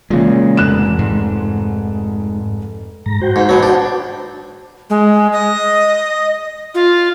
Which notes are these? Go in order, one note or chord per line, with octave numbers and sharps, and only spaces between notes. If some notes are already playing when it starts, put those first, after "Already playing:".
A#2 C#3 E3 G#3
F1 F#6 E7
G#2
G#2 A#5
F#4 C5 G5
G#2
B2 F#3
D4
G#3
D#5
F4